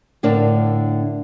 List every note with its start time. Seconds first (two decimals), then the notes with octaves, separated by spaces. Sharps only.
0.23 A2 D3 D4 A#4 A5